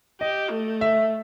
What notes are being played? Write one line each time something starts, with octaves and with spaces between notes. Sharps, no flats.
G4 D#5
A3
E5